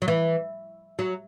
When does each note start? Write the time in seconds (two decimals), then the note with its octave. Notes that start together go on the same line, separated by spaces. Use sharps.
0.02 F#3
0.08 E3
0.99 F#3